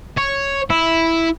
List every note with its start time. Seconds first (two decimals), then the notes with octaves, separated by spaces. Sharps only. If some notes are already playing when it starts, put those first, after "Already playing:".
0.17 C#5
0.70 E4